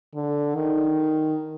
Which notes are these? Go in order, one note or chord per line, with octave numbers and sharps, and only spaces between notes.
D3
D#3